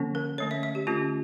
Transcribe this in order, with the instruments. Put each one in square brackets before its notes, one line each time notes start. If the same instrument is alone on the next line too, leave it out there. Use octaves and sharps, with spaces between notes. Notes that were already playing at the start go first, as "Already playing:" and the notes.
Already playing: [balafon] D3 F3 A#3 C#4
A#4
D3 A3 C#4 C#5
E5
E5
G4
D3 A3 C#4 F4